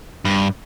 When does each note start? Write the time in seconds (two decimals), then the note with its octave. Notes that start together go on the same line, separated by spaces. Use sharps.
0.25 G2